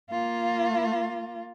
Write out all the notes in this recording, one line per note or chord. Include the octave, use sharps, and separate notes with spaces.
A#3 F4